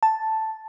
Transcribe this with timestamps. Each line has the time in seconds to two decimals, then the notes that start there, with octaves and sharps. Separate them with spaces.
0.03 A5